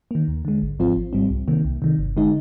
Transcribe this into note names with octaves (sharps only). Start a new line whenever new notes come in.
D#3 A#3
D#2
D3 G#3
G#1
G#2 F3 C4 F4
G#1
G#2 G3 C4
C2
C3 D#3 A#3
C2
C3 D#3
G1
D3 G#3 D#4